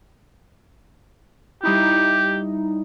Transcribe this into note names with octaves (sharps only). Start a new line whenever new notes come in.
G3 D#4 E4 G4